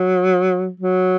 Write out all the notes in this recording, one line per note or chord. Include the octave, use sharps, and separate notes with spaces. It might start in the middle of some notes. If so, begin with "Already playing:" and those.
Already playing: F#3
F#3